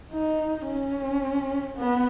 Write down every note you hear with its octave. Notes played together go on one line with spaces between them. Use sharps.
D#4
C#4
B3